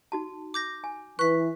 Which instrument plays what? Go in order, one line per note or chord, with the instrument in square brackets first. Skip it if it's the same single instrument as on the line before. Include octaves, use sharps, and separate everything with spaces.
[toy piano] D#4 F#4 A5
[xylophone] D6 G6 A#6
[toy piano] G#5
[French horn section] E3 [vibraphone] B4 [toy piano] C#6 [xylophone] F#6 B6